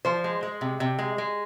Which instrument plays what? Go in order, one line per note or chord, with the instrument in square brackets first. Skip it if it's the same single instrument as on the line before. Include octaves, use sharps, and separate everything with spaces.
[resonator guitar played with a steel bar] F3 C5
G#3
G#3
C3
C3
G#3
G#3